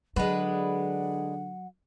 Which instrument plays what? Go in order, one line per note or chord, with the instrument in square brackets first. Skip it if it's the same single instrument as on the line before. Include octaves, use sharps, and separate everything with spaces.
[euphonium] D3 [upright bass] F#3 [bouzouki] G#3 D4 B4 [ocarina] F#5